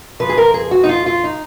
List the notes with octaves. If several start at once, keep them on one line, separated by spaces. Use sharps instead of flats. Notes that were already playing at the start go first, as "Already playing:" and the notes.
F2 C#3 F3 B4
G#4
A#4
G#4
F#4
D#4
F4
F4
D#4